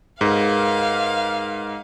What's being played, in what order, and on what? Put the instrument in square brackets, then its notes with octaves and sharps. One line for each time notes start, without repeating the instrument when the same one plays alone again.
[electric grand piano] G#2 [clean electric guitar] G#4 A#4 B4 [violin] F5